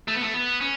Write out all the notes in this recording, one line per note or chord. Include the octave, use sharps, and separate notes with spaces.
A3
B3
A3
B3
C#4